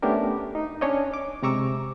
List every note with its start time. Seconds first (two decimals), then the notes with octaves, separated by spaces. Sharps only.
0.02 A3 B3 C#4 D4 G4 A#4
0.55 D#4
0.81 C#4 D4 C#5 D#5
1.14 D6
1.43 C3 G#3 A#5 C#6 D6 E6